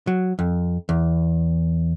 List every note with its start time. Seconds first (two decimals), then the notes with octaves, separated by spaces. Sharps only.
0.07 F#3
0.39 F2
0.89 E2